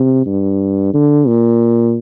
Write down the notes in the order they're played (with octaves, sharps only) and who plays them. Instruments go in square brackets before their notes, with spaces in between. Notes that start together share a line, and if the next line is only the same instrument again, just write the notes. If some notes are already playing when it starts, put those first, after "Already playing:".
Already playing: [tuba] C3
G2
D3
A#2